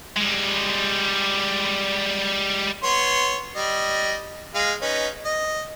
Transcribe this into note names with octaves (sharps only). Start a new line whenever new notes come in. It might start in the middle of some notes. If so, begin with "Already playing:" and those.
G3 G#3
B3 C#5 C6
G3 D#5
G#3 F5
C#4 D#4 B4
D#5